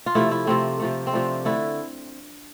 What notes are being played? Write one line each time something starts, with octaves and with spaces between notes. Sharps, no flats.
F4
C3 F3 A3 E4
E4
C3 F3 A3 C4
C3 F3 A3
C4
C3 F3 A3 D4
D3 A3 E4